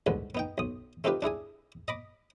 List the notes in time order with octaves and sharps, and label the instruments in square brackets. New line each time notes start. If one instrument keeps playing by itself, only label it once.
[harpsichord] C2 G#2 D3 B4
B3 D#4 G5
B1 D#6
A3 C4 D#4 F4 G4 B4
D4 E4 G#4 G#5
D#5 B5 D6